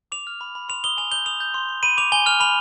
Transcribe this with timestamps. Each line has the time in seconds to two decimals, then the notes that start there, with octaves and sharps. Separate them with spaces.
0.12 D6 F7
0.27 F6
0.41 B5
0.55 B5
0.69 C6 F7
0.84 D#6 G7
0.97 G#5 F7
1.11 G6 G7
1.26 D#6 F7
1.40 G6
1.54 C6
1.69 C6
1.83 B5 D#7
1.97 D6 F7
2.12 G#5 G7
2.26 F6 F7
2.40 B5 F7